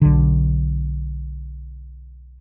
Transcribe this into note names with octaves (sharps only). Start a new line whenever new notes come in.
B1 D3